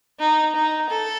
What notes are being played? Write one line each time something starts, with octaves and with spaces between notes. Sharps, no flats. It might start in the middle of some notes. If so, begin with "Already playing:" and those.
D#4
D#4
A4